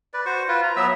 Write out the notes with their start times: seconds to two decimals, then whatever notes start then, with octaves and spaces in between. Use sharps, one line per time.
0.14 B4 D5
0.26 F#4 C5 C#6
0.48 F4 B4
0.63 A#5
0.76 F#3 B3 E5 E6